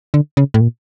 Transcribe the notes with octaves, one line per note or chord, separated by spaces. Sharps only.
D3
C#3
A2
A#2